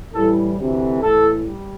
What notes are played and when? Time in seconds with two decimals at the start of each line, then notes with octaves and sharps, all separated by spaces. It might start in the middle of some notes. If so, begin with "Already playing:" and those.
0.14 A2 E3 G3 A4
0.58 D2 C3 E3
1.02 A2 E3 A3 A4
1.46 G3